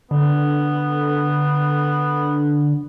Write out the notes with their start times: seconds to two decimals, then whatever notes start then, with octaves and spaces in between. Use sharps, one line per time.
0.11 D3 B3